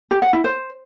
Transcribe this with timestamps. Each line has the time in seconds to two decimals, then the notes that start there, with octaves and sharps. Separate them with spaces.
0.11 G4
0.22 F#5
0.33 E4
0.44 C5